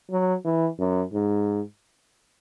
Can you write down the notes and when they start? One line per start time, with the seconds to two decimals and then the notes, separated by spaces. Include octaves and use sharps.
0.10 F#3
0.45 E3
0.79 F#2
1.13 G#2